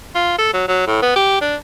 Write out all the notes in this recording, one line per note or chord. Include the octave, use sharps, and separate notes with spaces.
F4
A4
F#3
F#3
A2
B3
G4
D4